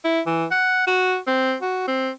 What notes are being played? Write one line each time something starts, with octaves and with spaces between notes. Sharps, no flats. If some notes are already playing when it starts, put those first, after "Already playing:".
E4
E3
F#5
F#4
C4
F#4
C4